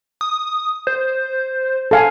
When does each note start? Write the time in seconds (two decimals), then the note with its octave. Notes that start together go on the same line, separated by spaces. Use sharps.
0.21 D#6
0.87 C5
1.91 A4 F5 G#5